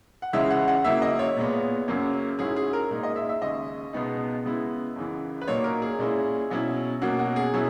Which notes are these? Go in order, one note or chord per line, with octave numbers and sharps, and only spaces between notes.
F#5
C#2 C#3 E3 G#3 C#4 E5
F#5
F#5
C#3 F#3 A#3 E4 E5
D#5
C#5
A#2 G#3 B3
F#2 C#3 F#3 A#3 C#4
G#2 F#3 C#4 E4 G#4
G#4
A#4
A#2 G#3 D#4
D#5
E5
E5
D#2 C#3 G#3 D#5
C#2 B2 G#3 B3 D#4
C#3 G#3 B3 E4
F#2 C#3 E3
B4
A#2 F#3 A#3 D#4 C#5
A#4
G#4
A#2 G#3 C#4 E4
B2 F#3 C#4 E4
B2 F#3 A#3 C#4 F#4
F#4
G#4
B2 F#3 C#4 E4